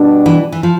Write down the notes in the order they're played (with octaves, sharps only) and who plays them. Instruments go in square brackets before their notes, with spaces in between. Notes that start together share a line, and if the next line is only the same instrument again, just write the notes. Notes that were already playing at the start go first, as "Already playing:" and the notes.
Already playing: [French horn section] B2 G3 B3 D4
[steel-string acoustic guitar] E3
E3
F3